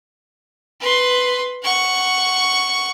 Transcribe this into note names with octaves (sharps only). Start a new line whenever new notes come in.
B4 C6
F#5 C#6